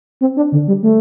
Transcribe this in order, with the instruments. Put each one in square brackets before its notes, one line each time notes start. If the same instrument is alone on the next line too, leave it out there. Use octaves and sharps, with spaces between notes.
[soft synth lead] C4
D4
D3
G3
A3